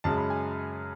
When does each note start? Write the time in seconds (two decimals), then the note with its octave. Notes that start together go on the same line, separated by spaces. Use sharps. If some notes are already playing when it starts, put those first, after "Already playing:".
0.04 F#2 C#3 G#3 A5
0.17 B5
0.30 G#5